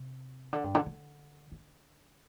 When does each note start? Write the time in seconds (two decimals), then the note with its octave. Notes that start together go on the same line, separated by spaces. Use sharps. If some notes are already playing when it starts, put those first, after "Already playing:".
Already playing: C3
0.53 D3
0.64 G2
0.75 D3
0.86 D3
1.52 D3